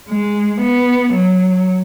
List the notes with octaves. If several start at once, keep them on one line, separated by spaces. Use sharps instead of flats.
G#3
B3
F#3